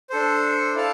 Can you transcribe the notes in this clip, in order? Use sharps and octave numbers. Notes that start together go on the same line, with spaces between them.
D4 A4 C5
E4 A4 D5 F5 A5